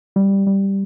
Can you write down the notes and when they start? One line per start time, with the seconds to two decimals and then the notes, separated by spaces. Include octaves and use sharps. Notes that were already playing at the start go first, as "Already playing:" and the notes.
0.16 G3
0.47 G3